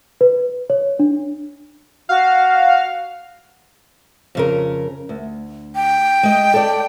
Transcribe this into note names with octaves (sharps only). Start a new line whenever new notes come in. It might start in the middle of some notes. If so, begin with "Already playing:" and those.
B4
C#5
D4
F#4 F5
F2 C#3 A#4
D2
G5
G#3 D#5
A4 D5